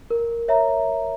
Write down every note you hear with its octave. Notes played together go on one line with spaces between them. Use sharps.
A#4
C#5 E5 A#5